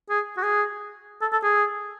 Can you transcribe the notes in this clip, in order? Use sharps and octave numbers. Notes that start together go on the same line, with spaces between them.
G#4
F#4
G#4
A4
A4
G#4